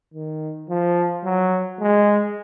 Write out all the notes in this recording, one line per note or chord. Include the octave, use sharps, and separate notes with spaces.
D#3
F3
F#3
G#3